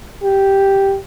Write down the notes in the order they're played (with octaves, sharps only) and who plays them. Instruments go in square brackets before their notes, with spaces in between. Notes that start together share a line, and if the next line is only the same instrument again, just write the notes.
[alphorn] G4